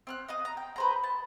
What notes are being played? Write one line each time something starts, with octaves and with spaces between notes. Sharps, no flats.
C4 F6 F#6
D#5 F5 D#6
A#5
G5
B4 C5 A#5
A5